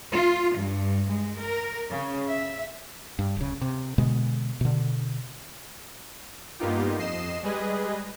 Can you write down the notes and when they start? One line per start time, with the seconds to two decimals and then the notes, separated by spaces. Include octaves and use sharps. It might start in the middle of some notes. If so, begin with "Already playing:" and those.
0.12 F4
0.57 G2
1.08 G#3
1.38 A#4
1.91 C#3
2.28 E5
3.19 G2
3.37 D1 C#3
3.61 C3
3.98 B2 D3 G#3 B3
4.61 B2 D3
6.59 G2 A#3 B3 D#4 F4 G4
6.98 F2 D#5 C7 E7
7.43 G3 G#3 G#4 B4 D#5